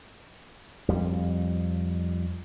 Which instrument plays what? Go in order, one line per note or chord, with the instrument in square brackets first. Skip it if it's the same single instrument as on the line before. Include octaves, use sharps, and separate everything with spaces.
[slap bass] F2 G3